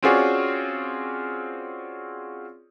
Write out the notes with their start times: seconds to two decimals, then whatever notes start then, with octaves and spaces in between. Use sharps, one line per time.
0.03 C4 C#4 F4 F#4 G#4 D5